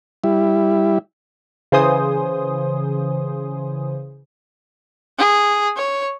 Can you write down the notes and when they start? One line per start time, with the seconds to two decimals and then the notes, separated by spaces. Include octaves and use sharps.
0.24 G3 E4
1.72 C#3 E3 C5 G#5 C6 D#6
5.18 G#4
5.76 C#5